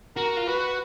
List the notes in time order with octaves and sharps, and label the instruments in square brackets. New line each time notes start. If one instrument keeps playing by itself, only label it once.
[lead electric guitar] F#4 [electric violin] A#4
[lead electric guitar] F4
[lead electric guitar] F#4 [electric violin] B4